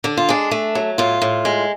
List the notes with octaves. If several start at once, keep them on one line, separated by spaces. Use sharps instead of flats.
D3 D4
F4
G#3 D4
A3
F#3
A2 F4
A2
G#3